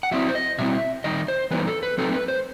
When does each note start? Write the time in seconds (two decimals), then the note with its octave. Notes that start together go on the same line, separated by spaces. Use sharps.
0.03 F#5
0.11 F#3 C4 E4 E5
0.28 C5
0.35 D#5
0.58 B2 G3 C4 E4 E5
1.04 D#3 G3 D#4 D#5
1.28 C5
1.51 E3 G3 B3 D#4 B4
1.67 A4
1.83 B4
1.98 F#3 A3 C4 D#4 A4
2.12 B4
2.28 C5